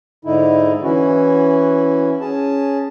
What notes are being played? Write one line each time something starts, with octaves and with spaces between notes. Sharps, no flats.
G#2 D3 D#4 E4
E3 C#4 E4 F#4
C#4 G#4 A5